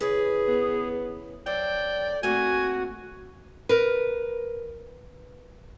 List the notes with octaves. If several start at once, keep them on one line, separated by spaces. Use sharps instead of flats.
C#3 E3 G#4 B4
B3
F#2 A4 C5 D5 G5
A3 A#3 C4 F#4 G#5
A#4 B4